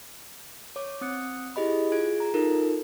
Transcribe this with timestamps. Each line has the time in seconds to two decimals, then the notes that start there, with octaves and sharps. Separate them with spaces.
0.76 C#5 D6
1.01 C4 D#6 F#6 C#7
1.56 E4 G4 G#4 D#5 B5
1.92 F4 G#4 G#6 D7
2.20 A#5
2.34 D#4 F4 A4 A#4